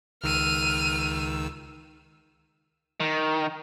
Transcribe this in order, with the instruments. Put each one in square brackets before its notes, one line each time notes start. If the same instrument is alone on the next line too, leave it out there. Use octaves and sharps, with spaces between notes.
[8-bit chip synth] C#2 D#3 E6 [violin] F6 D#7
[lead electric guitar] D#3